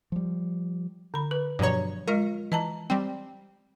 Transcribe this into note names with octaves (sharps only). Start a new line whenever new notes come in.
F3 G3
D3 B5
B4
G2 B2 F3 F#3 C#5 A#5
G#3 F4 A#4 D#5
E3 D#5 A5 A#5
G3 C4 G5